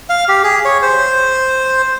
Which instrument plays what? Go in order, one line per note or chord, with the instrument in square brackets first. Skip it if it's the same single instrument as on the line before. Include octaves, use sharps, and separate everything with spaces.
[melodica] F5
G4
G#4
C#5
C5